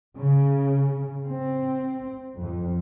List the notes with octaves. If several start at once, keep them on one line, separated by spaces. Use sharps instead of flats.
C#3
C4
F2